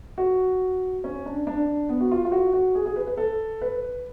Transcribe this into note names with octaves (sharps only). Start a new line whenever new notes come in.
F#4
C#4
D4
D4
B3
F#4
F4
F4
F#4
F#4
G#4
G#4
B4
B4
A4
B4